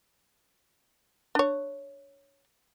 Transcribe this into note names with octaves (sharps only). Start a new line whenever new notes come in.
D4 C#5